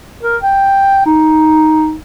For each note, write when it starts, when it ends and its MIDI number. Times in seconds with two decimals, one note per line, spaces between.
0.23 0.37 70
0.42 1.06 79
1.06 1.96 63